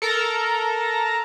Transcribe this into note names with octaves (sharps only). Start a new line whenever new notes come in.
A4 A#4 A#5